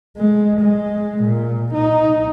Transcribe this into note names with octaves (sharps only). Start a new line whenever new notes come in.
G#3
G#3
A#2
D#4